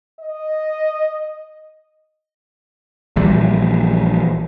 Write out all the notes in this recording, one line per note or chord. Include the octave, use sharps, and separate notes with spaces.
D#5
A#1 E3 G3